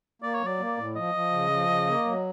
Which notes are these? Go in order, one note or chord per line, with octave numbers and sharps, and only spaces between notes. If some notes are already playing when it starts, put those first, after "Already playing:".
A#3 D5
C#5
F#3
D5
A#3
A2
F3 D#5
F3
C#3
F3
C#3
A#3
F#3